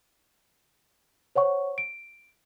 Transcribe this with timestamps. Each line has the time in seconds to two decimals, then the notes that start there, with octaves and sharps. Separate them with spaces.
1.36 C5 C#5 F#5 C#6
1.78 D7